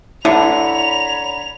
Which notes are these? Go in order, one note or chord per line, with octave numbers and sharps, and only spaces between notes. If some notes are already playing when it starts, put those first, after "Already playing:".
D3 E4 C#5 A#5 B5 F7